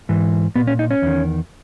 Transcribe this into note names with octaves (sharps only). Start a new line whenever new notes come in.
G#2 E3
A#2 B3
C#4
D#4
C#4
E2 D#3